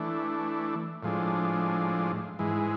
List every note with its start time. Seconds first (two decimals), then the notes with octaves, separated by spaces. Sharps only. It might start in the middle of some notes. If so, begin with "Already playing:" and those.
Already playing: E3 A3 D4
1.03 A2 F3 G#3 D4
2.39 G#2 E3 G#3